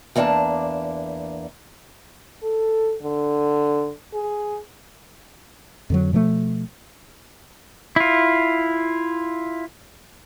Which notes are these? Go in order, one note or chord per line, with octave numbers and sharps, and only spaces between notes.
E2 A#3 D4 F#5 A5
A4
D3
G#4
F2 D3 F#3
B2 F3 F#3 A3
E4 F4